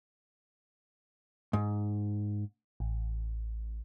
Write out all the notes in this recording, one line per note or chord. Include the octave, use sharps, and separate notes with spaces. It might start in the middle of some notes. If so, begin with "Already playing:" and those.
G#2
A1